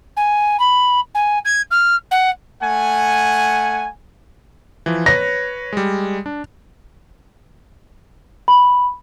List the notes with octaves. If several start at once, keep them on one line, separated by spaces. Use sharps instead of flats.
G#5
B5
G#5
G#6
F6
F#5
A3 F#5 G#5
E3 F3
B4 C#5 A#6
G3 G#3
D4
B5